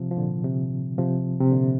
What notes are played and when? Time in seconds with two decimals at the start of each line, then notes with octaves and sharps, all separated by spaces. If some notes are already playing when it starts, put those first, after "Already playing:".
Already playing: C3 F3
0.11 F3
0.17 A#2 D3
0.44 C3
0.98 C3 F3
1.41 C3
1.52 A#2 D3